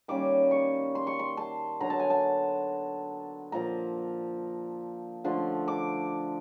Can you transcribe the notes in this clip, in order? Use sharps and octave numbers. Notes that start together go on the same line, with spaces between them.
D#3 G3 A#3 C#4 D6
C#6
C6
C#6
C6
A5
D3 F#3 B3 A#5
A5
G#5
A5
A#2 F3 A#3 A#5
D3 F3 A3 C6
D6